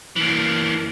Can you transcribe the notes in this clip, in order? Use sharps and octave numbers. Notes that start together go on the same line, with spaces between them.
E3 A#3